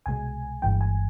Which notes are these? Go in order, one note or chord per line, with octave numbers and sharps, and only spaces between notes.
C2 B2 G#3 G#5
G1 G2 E3 G#3 G5
G#5